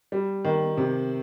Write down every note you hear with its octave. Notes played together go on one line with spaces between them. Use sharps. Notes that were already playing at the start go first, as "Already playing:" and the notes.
G3
D#3
C3